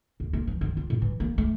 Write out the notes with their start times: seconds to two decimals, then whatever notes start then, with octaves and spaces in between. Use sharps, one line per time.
0.20 D#2
0.33 A#3
0.47 F3
0.61 D#3
0.77 F4
0.90 A2
1.02 E3
1.20 A#3
1.38 A3